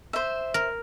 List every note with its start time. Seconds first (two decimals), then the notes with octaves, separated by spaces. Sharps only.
0.13 C5 E5
0.54 A#4